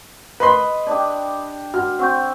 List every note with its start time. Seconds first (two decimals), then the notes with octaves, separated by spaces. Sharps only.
0.40 B4 D#5 B5 C6
0.87 D4 G4 D5 D#6
1.74 F#4 F#5 F6
1.99 C4 F#5 C#6 G6